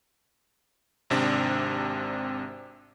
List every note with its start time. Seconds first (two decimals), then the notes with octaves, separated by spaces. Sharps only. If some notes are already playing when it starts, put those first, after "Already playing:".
1.10 G#1 C3 D4